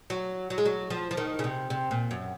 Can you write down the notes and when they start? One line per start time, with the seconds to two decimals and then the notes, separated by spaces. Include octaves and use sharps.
0.10 F#3
0.50 F#3
0.58 G#3
0.65 F#3
0.90 F3
1.11 F3
1.17 D#3
1.39 C#3
1.44 C3
1.70 C3
1.91 A#2
2.11 F#2